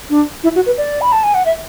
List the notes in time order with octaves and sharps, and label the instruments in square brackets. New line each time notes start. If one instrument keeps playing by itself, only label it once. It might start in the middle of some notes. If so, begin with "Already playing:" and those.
[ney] D4
E4
F#4
B4
D5
B5
A5
G#5
F#5
E5